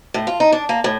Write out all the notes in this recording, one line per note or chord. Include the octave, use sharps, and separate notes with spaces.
A2
F4
D#4
D4
A#3
A2